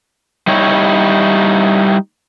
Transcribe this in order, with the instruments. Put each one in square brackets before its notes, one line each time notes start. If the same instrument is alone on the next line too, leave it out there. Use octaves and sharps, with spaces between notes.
[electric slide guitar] G3 D#4 E4 C#5